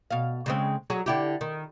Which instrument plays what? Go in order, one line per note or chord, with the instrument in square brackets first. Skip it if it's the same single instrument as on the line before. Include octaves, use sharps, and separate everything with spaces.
[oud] B2 F5
C#3 G#3 C4
F#3 F#4 G#4
D3 E4 G4
D#3